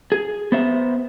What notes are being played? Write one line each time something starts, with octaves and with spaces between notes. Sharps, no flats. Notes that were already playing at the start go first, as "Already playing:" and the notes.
G#4
B3 C5 E5